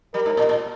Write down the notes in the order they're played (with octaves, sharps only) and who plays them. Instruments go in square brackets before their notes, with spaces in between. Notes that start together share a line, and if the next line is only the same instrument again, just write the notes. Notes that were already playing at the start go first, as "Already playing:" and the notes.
[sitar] G3 [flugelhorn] A#4
[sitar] G#2
A#2
A#2